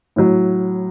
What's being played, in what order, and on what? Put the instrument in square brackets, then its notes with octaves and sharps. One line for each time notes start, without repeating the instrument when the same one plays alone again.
[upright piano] A2 F#3